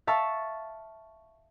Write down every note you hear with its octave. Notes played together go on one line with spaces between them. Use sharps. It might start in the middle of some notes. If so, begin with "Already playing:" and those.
E5 F5 A5 C#6